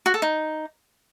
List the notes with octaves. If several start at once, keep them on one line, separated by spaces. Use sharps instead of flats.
F#4
A4
D#4